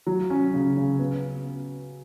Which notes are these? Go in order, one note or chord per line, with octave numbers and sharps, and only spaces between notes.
F#3
C#4
C#3
C#3
B3